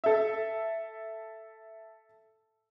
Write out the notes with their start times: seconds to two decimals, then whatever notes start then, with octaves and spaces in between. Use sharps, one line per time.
0.04 A4 E5